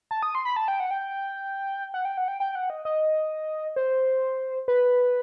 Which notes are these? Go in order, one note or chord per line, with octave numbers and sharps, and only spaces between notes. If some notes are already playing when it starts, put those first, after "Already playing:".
A5
D#6
C6
B5
A5
G5
F#5
G5
F#5
G5
F#5
G5
G5
F#5
D#5
D#5
C5
B4